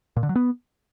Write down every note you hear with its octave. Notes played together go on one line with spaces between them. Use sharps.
A#2
D3
F#3
B3